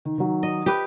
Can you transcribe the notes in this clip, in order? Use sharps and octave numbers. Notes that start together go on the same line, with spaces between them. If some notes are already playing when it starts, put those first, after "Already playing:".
D#3
D#3 F#3
D#5
G4 B4